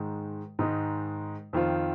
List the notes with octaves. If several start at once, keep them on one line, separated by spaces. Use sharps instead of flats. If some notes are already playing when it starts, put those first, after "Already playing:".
Already playing: G#2 D#3 G#3 D#4
G#2 D#3 G#3 D#4
F2 D#3 C4 F4